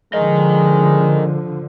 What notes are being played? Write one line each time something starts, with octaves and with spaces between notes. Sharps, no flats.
D3 F3 G#3 A#4 D#5